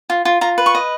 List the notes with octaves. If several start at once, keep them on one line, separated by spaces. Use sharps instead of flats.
F4
F4
F4 A#5
B4
C#6
D#5